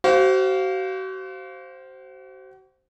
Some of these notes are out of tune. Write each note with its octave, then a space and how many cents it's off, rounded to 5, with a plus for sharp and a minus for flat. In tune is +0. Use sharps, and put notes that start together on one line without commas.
F#4 +40 C5 +0 F5 +0